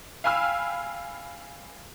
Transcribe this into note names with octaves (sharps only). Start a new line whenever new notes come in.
F5 G5 G#5 B5 E6 F6